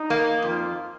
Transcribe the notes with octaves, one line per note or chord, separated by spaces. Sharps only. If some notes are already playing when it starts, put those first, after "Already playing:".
Already playing: D#4
A#3
F2 F4